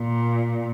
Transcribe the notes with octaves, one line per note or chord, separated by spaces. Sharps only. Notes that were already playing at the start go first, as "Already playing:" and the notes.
Already playing: A#2